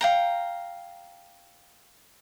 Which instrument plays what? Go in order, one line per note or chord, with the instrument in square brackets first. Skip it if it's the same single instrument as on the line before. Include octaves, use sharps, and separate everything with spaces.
[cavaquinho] F5 G5 A#5